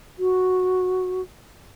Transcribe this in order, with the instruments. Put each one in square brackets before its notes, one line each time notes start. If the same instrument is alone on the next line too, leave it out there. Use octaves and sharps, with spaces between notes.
[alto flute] F#4